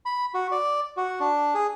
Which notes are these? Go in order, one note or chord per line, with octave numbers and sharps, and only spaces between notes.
B5
F#4
D5
F#4
D4
G#4